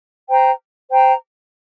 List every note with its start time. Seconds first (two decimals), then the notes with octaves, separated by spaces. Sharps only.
0.30 C5 G5 A#5
0.91 C5 G5 A#5